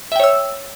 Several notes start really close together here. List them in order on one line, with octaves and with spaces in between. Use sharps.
E5 G5 C#5 E6